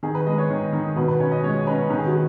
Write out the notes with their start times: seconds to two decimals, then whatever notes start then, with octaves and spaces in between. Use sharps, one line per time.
0.03 D#3 G#4
0.15 B4
0.27 G#3 D#5
0.38 C#5
0.50 D#3
0.73 D#3
0.96 B2 B4
1.08 B4
1.20 C#4 C#5
1.32 D#5
1.44 G#3 C#5
1.67 C#4 B4
1.90 D#3 B4
1.98 G#4
2.07 F#4